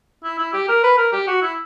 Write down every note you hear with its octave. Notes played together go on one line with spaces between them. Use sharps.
E4
E4
G4
A#4
B4
A#4
G4
F#4
E4